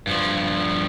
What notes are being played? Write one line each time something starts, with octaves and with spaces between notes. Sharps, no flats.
G2 F3